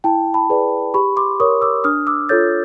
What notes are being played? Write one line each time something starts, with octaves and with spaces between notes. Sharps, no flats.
E4 G5 A5
A5 B5
G#4 B4 D5
G4 B5 C#6
C6 D6
A#4 C#5 C#6 D#6
D6 E6
D4 D#6 F6
D6 E6
F4 A4 C#5 G6 A6